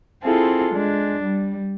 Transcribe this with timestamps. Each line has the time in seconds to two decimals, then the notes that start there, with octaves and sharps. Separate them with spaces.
0.24 C4 E4 F4 G#4 A4
0.71 G#3 D4
1.25 G3